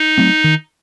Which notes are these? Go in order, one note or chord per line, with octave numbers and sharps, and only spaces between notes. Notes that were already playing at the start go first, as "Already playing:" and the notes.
Already playing: D#4
F#3 A3 C4
D#3